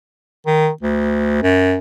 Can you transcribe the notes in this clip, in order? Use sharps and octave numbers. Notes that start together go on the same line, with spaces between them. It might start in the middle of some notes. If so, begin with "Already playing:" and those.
D#3
D2
F#2